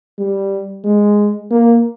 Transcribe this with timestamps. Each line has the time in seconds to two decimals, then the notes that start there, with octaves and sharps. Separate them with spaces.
0.18 G3
0.84 G#3
1.51 A#3